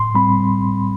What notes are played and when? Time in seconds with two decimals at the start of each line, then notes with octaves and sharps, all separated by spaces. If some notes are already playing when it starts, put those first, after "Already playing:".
Already playing: A2 C6
0.15 G3 C4 B5